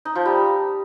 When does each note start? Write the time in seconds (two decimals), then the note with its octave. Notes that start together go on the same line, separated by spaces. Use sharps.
0.05 D#4
0.15 F3
0.25 G3